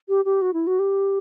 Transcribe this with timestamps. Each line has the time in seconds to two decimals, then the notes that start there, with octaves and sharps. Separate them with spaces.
0.09 G4
0.25 G4
0.42 F#4
0.53 E4
0.67 F#4
0.79 G4